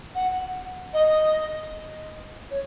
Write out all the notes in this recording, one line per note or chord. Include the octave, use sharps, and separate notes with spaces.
F#5
D#5
C#5